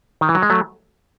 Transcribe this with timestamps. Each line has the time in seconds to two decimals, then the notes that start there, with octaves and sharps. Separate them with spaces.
0.21 D#3
0.29 E3
0.35 F#3
0.42 G#3
0.50 F#3 A3